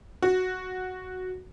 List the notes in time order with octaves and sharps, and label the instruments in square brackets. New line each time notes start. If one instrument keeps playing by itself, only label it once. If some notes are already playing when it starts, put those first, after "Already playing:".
[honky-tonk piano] F#4